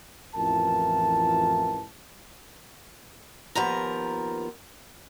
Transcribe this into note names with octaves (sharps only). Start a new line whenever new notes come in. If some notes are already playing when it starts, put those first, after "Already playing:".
A1 F2 E3 F4 A#4 A5
D#2 F3 B3 A#4 A#5